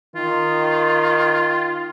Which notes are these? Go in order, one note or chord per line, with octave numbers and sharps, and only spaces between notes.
D#3 F4